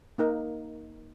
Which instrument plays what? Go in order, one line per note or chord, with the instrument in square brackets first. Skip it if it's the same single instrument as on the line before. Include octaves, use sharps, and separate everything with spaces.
[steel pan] A#3 D#4 A#4